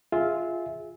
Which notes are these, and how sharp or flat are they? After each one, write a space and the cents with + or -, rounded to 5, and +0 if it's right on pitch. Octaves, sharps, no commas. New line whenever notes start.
F4 +0 G#4 +0 E5 -20